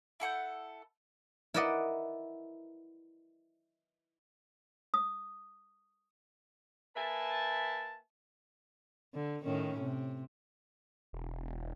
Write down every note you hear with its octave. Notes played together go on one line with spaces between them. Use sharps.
E4 A4 F#5 G6
E4 A#4 B4 D5 D#5 F#5
D#6
A#3 B4 E5 G#5 A5
D3
A2 D#3 C#4
C3
E1